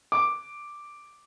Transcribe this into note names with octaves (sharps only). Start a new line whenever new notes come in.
D6